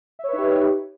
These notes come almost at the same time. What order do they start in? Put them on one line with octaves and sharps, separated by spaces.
E5 C#5 B4 D#4 G4